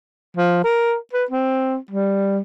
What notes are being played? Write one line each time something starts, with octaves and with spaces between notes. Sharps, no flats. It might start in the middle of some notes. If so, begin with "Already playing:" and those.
F3
A#4
B4
C4
G3